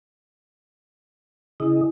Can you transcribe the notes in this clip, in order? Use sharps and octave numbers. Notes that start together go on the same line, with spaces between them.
C#3 E4 G#4 D#5